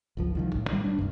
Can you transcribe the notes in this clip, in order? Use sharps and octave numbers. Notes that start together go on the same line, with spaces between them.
G#1 C#2 F3
C2 D#3 F3
A1 A2
D#3 G3
D4
C2 G2